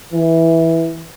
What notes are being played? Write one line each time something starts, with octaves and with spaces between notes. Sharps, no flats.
E3